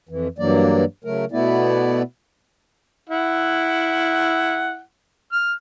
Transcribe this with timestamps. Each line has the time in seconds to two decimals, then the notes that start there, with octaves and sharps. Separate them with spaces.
0.09 F2 E3
0.39 G2 E3 F#3 A#3 D5
1.04 C#3 F#3 A3 A#4
1.32 B2 A3 B3 E4 D5
3.10 E4 F#5
5.32 F6